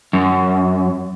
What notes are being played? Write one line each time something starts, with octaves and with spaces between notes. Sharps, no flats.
F#2